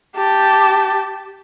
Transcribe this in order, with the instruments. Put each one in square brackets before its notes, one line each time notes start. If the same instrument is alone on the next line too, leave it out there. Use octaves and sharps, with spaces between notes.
[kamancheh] G4 A5